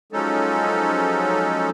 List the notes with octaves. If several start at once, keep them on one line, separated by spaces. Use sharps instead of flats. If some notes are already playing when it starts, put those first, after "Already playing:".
F3 F#3 G#3 C#4 D#4 A4